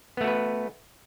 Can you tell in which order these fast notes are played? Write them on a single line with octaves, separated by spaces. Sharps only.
B3 A3 F#4 B4